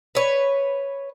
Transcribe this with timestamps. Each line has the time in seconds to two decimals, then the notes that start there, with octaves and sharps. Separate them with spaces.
0.15 B4 C#5